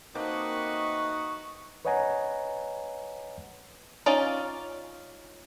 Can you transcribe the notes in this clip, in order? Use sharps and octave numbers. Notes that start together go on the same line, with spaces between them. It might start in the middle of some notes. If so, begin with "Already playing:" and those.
A3 A#3 C4 D#4 F#4 B4 D#5 C#6
B4 C#5 D#5 F#5 G#5 A#5
C#4 D#4 F4 D5 F5